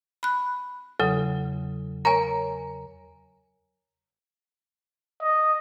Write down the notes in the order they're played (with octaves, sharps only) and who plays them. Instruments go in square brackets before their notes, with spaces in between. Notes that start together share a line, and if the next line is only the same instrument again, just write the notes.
[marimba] B5 F#6
[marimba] E2 C#3 F#3 [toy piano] A4
[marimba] A#4 C#5 [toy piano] G#5 A#5
[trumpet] D#5